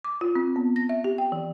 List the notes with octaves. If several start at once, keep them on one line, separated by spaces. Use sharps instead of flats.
D6
F4
C4
B3
A#6
E5
G4
G5
E3